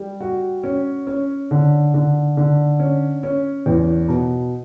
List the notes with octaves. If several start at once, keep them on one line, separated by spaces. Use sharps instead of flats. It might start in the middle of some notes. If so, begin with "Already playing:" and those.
Already playing: G3
F#4
C#4
C#4
D3
D3
D3
C#4
C#4
E2
B2